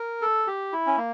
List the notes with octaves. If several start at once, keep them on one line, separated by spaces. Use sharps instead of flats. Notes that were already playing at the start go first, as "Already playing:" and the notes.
Already playing: A#4
A4
G4
E4
C#4
A#3